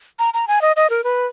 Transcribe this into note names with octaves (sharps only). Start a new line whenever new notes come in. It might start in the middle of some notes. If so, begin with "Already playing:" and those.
A#5
A#5
G#5
D#5
D#5
A#4
B4